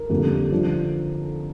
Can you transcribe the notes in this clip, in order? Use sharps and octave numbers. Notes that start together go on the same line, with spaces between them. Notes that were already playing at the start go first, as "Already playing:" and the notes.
Already playing: A#4
F2 D3 G3 A#3
D3 F3